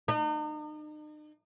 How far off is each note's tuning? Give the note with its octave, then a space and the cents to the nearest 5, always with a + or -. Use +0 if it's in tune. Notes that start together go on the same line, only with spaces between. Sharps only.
D#4 -40